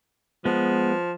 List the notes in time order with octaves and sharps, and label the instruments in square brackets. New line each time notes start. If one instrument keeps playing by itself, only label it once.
[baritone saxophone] F3 [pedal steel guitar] G#3 B3